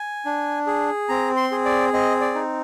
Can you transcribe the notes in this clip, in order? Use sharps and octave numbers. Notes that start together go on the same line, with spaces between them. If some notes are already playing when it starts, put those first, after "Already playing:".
Already playing: G#5
D4
G#4
C4 A#5
C6
G#4
D5
C4 D#5
D5
D#4